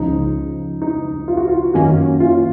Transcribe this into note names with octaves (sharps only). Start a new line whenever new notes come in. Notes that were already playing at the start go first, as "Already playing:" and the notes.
Already playing: C#2 C#3 F3 D#4
D#4
F4
F#4
F4
F#2 D#3 A#3 C#4 F#4
F4